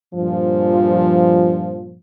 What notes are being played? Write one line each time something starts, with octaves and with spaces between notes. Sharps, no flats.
G2 A#2 F3